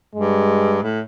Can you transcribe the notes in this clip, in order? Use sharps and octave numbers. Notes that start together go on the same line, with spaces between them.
G2 G#3
A2